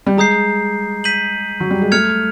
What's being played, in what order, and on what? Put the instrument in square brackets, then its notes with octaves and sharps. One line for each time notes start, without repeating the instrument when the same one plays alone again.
[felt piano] G3
[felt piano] G#3 [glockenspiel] A#5 D#6 G6 C7
[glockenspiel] G6 B6 D#7 F#7
[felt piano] F#3
G3
G#3
[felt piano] A3 [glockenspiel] F6 G#6 C#7 F7